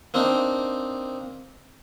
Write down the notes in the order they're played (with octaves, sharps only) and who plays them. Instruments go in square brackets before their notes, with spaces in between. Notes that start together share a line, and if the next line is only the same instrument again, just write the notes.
[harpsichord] A#3 C4 D4 D#4